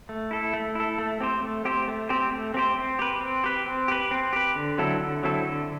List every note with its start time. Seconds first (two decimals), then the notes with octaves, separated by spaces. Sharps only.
0.09 A3
0.31 E4 A4
0.53 A3
0.75 E4 A4
0.98 A3
1.20 C4 G4 C5
1.42 A3
1.65 C4 G4 C5
1.88 A3
2.09 C4 G4 C5
2.32 A3
2.54 C4 G4 C5
2.76 C4
2.99 G4 B4
3.21 C4
3.44 G4 B4
3.66 C4
3.88 G4 B4
4.11 C4
4.33 G4 B4
4.56 D3
4.78 F#3 C4 E4 A4
5.00 D3
5.23 F#3 C4 E4 A4
5.45 D3